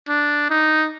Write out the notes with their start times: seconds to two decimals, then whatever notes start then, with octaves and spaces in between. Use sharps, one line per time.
0.08 D4
0.50 D#4